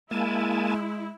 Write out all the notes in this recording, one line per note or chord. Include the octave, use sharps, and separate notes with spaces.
G#3 A#3 E4 G#5 A5